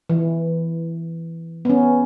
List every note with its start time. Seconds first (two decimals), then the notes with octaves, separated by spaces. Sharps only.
0.09 E3
1.65 B3 C#4